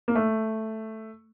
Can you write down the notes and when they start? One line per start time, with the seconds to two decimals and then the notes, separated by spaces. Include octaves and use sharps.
0.08 A#3
0.15 A3